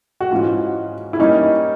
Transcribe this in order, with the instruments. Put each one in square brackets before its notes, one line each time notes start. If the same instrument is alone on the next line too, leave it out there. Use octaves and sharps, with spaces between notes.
[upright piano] F#4
[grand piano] G#2 E3 G#3 C#4 F#4 [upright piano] F4
[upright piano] E4
[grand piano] E3 G3 A#3 C#4 [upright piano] D#4